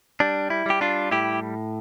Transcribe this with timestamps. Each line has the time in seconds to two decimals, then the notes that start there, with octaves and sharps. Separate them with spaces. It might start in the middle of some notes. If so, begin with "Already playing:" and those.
0.20 G3 D4
0.50 E4
0.66 G3 G4
0.81 D4 F4
1.11 A2 E4 G4